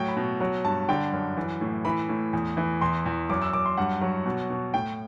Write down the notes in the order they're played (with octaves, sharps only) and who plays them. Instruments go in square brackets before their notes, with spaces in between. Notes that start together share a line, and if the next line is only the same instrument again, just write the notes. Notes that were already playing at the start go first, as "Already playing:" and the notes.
Already playing: [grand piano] A2 F#3 G5
B5
B2
F#3
G2 A5
D3 G5
F#2
E3
A2
E3 B5
A2
E2
E3
E2 C6
E2
F#2 D6
E6
F#2 D6
C6
G2 F#5
F#3
B2
B2
A2 G5